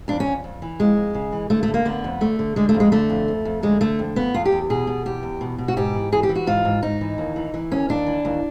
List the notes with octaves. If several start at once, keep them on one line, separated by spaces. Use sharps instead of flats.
F2 D4
C#4
F2
F2
E3
F2 G#3
F2
C#3
E3
D3 A3
A3
D3
A#3
D3 B3
F2
D3 A3
D3
D3 G#3
A3
F2
G#3
D3 A3
F2
F2
F2
D3 G#3
D3 A3
F2
F2 B3
E2 F4
G4
E2
B2 G#4
B2
E2 G4
E2
B2
B2
F#4
G#2 G4
E3
E3 G#4
G4
E3
F#4
G#2 F4
G#2
G#2 D#4
E3
D#2
E3
E3
D#2 C#4
D#2 D4
E3
D#2